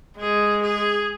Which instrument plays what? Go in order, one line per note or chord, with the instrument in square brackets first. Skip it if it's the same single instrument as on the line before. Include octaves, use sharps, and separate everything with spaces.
[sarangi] G#3 [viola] G#4
[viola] G#4